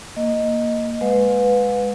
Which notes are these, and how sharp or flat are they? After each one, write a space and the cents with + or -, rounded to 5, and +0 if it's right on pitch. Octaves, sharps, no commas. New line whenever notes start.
A#3 +0 D#5 +0
G#3 +0 B4 +0 F5 +45